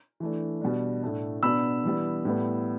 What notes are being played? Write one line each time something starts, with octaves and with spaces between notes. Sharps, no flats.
E3 A3 D4
B2 G3 D4
A2 A3 D4
B2 B3 D4 B5 E6
E3 G3 B3
A2 G3 B3